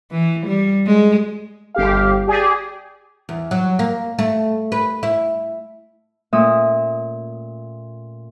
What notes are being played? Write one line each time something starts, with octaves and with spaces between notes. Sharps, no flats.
E3
G3
G#3
G1 G4 F5
G4 G#4 D5
E2
F#3
A#3
A3
B4
E4
A#2 A3 C#4 E5 D#6 E6